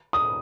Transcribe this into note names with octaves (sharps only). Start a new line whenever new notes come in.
D#6